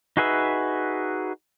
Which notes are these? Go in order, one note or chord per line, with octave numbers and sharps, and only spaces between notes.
D#4 F#4 G#4 B4 E5